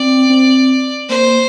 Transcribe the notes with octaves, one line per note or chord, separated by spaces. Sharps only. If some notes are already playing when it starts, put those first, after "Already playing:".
Already playing: C4 D5
C4
A#3 C5